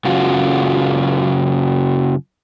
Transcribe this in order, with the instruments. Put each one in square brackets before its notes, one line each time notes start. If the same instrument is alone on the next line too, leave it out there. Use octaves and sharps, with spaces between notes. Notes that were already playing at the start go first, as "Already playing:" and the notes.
[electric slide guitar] F#2 C#3 F4 F#4